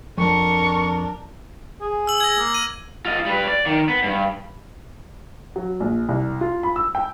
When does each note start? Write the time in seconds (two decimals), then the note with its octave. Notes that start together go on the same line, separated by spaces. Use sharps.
0.18 F2 D4 A#4 C#6
1.81 G#4
2.07 E6 F#7
2.20 G#6 A#6
2.38 A#3
2.54 D#7
3.05 F4 D#5
3.26 G3 B4
3.48 D5
3.66 D#3
3.89 B3
4.04 G2
5.56 F#3
5.80 A#1
6.09 C2
6.41 F4
6.63 B5
6.76 E6
6.95 G5